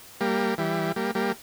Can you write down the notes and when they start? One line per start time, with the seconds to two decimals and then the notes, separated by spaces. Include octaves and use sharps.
0.21 G3 A#3
0.58 E3 G3
0.96 G3 A#3
1.15 G3 A#3